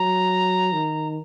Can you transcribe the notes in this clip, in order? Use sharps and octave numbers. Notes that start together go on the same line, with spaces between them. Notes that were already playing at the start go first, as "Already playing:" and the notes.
Already playing: F#3 A#5
D#3